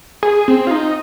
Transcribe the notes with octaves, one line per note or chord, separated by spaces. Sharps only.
G#4
C4
F4
D#4